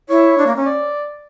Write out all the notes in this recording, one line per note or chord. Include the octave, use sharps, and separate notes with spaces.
E4 C#5
D4
A#3
C#4
D5